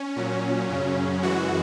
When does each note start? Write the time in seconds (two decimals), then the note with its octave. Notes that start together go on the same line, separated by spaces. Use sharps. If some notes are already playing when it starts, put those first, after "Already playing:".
Already playing: C#4
0.16 A#2 F#3
0.69 F#2 C#3 F#3
1.23 F#2 E3 G#3 F#4